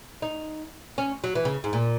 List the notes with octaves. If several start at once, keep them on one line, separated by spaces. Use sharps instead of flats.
D#4
C#4
F#3
E3
C#3
G#2
A#2